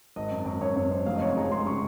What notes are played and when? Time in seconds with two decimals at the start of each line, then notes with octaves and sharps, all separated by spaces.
0.16 G#1 D#5
0.31 F#2
0.46 F#2
0.61 F#2 C#5
0.76 F#2 C#5
0.91 G#1 C5
1.06 F1 F5
1.15 D#5
1.21 F2 C#5
1.36 G#3 A#5
1.51 G#3 C6
1.66 C#3 C#6